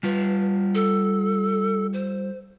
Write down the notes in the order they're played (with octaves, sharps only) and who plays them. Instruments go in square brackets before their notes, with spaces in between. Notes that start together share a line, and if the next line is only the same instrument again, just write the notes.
[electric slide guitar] G3 F4 [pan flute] B4
[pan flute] A4
C5